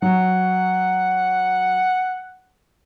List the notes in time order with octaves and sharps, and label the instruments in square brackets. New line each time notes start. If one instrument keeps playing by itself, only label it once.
[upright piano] F#3 [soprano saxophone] F#5